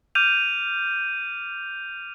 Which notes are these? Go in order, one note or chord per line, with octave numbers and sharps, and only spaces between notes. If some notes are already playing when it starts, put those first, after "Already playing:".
D6 F6 G6 D#7 F7